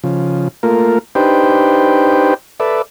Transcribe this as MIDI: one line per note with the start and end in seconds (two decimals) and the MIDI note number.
0.04 0.48 49
0.04 0.48 53
0.63 0.99 57
0.63 0.99 58
0.63 0.99 65
0.63 0.99 70
1.15 2.34 62
1.15 2.34 63
1.15 2.34 67
1.15 2.34 71
1.15 2.34 72
1.15 2.34 79
2.60 2.82 69
2.60 2.82 71
2.60 2.82 74
2.60 2.82 76